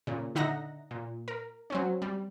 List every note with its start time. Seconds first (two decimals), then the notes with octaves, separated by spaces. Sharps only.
0.07 A#2 C#3
0.35 D3 D#4 E5 F#5 A#5 A#6
0.91 A#2
1.28 A#4
1.70 F#3 C4 C#4
2.02 G3